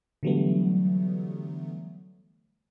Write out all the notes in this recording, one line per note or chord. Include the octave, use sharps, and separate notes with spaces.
D3 E3 F#3 G3 A3 B3